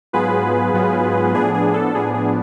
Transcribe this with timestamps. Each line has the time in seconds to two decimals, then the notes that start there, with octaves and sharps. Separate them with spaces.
0.13 G#2 F#3 B3 F4 G#4 B4
0.73 G#2 F#3 B3 F4
1.34 A2 F3 B3 D4 G#4
1.54 G#4
1.74 A4
1.95 A2 F3 B3 D4 G#4
2.14 G#4